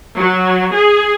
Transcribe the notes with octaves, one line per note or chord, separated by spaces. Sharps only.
F#3
G#4